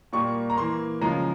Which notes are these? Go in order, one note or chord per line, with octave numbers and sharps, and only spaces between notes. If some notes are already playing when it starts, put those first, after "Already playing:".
A#2 G3 A#3 C#6
A#5
E3 A#3 C6
C#3 F3 G#3 A#5